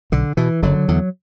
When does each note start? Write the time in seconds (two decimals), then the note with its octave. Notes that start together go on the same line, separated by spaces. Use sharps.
0.12 B1 D3
0.37 B2 E3
0.62 F#1 D3 F#3
0.88 E2 D3